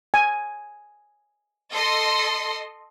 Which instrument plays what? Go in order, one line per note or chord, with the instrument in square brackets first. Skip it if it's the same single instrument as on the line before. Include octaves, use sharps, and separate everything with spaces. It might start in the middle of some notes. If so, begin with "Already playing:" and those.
[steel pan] G#5
[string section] A4 D#5 C6